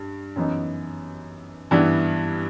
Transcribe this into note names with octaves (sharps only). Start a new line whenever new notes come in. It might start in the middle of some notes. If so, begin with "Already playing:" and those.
Already playing: G2
F#2 E3 B3 D#4
G2 E3 G3 B3 E4